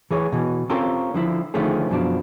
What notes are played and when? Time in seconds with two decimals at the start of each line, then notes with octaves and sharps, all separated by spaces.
0.11 E3 G#4 C#5
0.32 B2 E3
0.70 C4 C#4 F4 G4 A4 A#4
1.14 D3 F3 E4
1.54 D3 D#3 F3 A3 C#4 G#4
1.90 F#2 B2 F3 D4